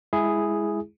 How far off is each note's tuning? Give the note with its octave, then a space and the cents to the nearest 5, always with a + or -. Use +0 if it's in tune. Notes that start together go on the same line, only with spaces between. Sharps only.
G#3 -5 E4 +0 G#4 +0